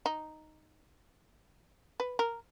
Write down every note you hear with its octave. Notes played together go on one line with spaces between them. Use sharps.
D#4
B4
A#4